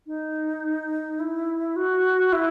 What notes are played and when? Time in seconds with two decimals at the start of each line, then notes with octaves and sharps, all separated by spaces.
0.07 D#4
1.20 E4
1.76 F#4
2.33 E4